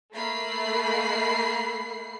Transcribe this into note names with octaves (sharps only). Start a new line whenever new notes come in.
A3 A#3 B5 C7